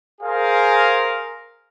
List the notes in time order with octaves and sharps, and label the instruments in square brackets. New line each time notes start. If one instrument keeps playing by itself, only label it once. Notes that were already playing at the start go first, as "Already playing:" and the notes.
[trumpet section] G#4 A#4 C5 F5